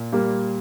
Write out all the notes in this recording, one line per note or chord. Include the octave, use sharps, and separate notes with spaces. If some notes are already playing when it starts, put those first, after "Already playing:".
Already playing: A#2
G3 A#3